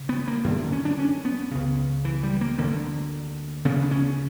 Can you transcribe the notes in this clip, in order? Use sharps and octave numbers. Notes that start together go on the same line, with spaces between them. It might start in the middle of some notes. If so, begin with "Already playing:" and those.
Already playing: C#3
B3
A#3
F#2 D3
D3
C#4
D4
C#4
B3
C#2 C#3
E3
G3
A#3
D2 D3 A#3
D2 C#3 B3
C#4